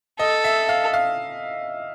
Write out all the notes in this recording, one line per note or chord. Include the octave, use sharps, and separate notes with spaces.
A4 D#5
E5
F5
F5